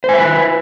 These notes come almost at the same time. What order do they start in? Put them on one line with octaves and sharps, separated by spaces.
C5 G#5 E5 B4